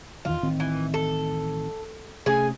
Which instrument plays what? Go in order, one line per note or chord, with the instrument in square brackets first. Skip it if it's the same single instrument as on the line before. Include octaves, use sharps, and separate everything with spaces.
[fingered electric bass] E2 D#3 E3 [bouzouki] F4
[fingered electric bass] A1 D#3 C4
[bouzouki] E3
A4
[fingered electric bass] C3 A3 C#4 [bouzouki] G#4 G#5